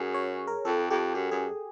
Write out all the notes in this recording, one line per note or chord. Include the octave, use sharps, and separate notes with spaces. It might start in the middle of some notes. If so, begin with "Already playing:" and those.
Already playing: F#2 G#4
C#5
A#4
F2 A4
F2 G4
F#2 G4
F#2 G#4